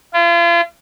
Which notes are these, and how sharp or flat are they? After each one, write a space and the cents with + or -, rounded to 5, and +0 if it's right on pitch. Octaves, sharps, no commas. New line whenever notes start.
F4 -40